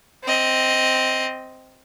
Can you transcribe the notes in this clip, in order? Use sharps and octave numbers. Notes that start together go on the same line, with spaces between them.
C4 D#5